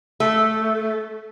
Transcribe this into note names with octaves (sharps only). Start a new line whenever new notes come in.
A3